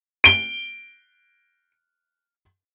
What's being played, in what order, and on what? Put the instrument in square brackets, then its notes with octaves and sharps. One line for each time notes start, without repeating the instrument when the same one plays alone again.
[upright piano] D7 G7